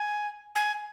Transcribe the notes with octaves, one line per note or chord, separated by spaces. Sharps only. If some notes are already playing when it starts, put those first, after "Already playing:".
Already playing: G#5
G#5